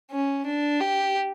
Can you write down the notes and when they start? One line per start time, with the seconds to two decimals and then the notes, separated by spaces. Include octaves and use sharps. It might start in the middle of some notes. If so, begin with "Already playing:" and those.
0.11 C#4
0.46 D4
0.81 G4